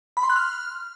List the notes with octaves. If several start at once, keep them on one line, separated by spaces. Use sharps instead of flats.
B5
C6
F#6
F6